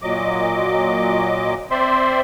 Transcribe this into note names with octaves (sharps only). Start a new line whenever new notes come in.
A#2 F#3 D#5 D6
C4 C5 D5 E5 C6